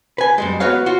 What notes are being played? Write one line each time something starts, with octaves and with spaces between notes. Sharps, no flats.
B4 G#5
F#2 G3 G#3
B3 F#4 B4 C#5 F5
F4 F#4